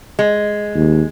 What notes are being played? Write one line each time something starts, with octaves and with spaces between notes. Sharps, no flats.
G#3
D#2